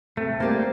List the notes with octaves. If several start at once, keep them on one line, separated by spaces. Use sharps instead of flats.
C3 A3
G3 A#3 C4 G4 C5